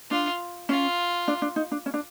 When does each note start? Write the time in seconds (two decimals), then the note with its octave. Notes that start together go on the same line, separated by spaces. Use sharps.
0.11 D4 F4
0.69 C#4 F4
1.28 D4
1.42 D4
1.56 D#4
1.72 D4
1.86 C#4
1.94 D4